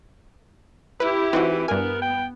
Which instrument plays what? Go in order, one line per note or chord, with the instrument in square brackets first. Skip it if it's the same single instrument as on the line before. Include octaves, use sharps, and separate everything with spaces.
[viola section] E4 G4 [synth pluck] B4
[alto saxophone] E3 [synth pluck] C4 D#4 F#4
[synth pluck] G2 G#5 [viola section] B3 [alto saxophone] A#4
[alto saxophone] G5